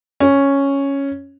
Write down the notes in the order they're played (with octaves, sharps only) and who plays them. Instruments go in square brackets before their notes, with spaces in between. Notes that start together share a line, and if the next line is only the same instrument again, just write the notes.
[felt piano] C#4